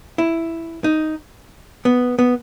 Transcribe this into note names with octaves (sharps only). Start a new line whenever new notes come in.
E4
D#4
B3
B3